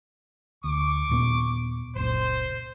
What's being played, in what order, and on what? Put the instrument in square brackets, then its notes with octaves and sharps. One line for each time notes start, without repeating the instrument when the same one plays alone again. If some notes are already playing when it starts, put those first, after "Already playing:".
[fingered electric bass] D2 [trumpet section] C#6 D6
[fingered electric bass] D#2 A#2 B3
[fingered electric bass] F#1 C#2 A#2 [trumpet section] C5